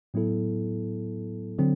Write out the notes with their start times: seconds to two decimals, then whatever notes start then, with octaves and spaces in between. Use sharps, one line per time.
0.14 A2 F#3 B3 E4 A4
1.59 D3 F#3 C4